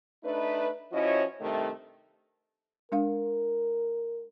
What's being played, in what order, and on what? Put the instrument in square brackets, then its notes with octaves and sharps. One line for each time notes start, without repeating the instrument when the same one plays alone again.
[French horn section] A3 D4 D#4 B4
F3 C#4 E4 F#4 C#5 D#5
G2 C3 D#3 A3
[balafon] G#3 D4 F5 [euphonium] A#4